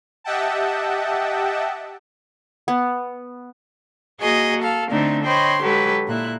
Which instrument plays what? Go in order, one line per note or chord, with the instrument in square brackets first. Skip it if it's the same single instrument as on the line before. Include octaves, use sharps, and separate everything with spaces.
[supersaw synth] G4 D#5 E5 F#5 G5 A5
[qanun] B3
[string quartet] A#3 F#4 G#4 D#5
A4 F5
D3 A3 C4 D4 D#4
C5 C#5 D#5 G5 B5 C6
F#3 G#3 G4 A4 B4
A#2 E4 F#6